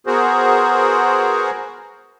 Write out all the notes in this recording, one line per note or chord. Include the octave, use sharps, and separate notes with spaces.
B3 F#4 G#4 A#4 C5